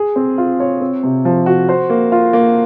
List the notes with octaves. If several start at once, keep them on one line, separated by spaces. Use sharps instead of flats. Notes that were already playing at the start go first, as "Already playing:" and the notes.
Already playing: G#4
C4
F4
C#5
C4
C3
F3
F#4
C5
A#3
F4
A#3